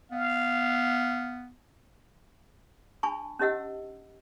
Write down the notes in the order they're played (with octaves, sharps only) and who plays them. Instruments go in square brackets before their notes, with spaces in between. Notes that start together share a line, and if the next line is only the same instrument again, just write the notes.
[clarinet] B3 [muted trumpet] F5
[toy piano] D4 G#5 A5 B5 C#6
C#4 D#4 G4 D#5 F#5 E6